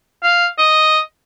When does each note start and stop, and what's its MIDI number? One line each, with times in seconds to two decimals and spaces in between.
0.23 0.47 77
0.58 0.99 75